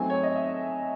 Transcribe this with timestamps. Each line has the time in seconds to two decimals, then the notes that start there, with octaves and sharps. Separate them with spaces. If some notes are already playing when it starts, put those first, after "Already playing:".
Already playing: F#3 A3 C4 D#4 G#5
0.10 C#5
0.23 D#5
0.35 E5